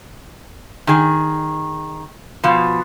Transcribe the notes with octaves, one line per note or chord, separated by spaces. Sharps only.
D#3 G#4
B2 F3